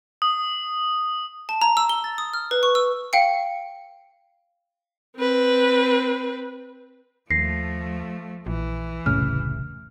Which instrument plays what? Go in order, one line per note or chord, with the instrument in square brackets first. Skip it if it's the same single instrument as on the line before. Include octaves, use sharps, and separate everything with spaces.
[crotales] D#6
[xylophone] A5
A#5
E6
G7
A6
D#6
F6
B4
C#6
E6
F5 G5 C#7
[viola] C4 B4
[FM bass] D#2 [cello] F3 A3 [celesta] A#6 C7
[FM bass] A#1 [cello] E3
[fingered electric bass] E1 C2 A2 [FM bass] C#3 [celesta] F6